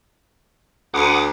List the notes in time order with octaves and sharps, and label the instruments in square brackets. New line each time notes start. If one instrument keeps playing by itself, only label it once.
[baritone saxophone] D2 [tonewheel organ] F#5 D6 D#6